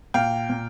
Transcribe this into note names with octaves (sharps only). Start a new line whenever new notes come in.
A#2 F5 G5
A#2